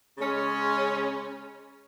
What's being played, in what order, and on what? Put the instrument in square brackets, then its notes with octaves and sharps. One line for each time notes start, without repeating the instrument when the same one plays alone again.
[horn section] C#3 G#3 C#4